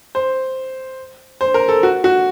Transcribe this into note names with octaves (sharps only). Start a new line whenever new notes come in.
C5
C5
A#4
A4
F#4
F#4